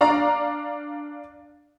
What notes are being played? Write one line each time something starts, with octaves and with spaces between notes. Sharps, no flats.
D4 D5 F5 A#5